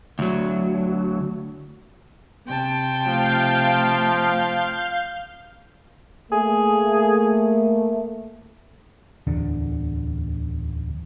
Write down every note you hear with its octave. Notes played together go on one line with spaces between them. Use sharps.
D2 F#3
C3 G5 A5
F3 A3 F5 G6
A3 A#3 G#4
D1 E2 D3